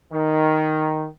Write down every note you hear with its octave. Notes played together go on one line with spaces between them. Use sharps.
D#3